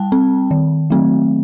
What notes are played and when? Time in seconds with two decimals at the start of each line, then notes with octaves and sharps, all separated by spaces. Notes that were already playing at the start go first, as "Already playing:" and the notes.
Already playing: G3 G5 A5
0.12 C4
0.51 D#3
0.90 F#3 A3 C4